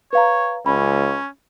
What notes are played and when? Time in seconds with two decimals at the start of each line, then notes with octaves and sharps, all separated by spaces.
0.13 B4 C#5 F5 A#5
0.66 C#2 C#4 B5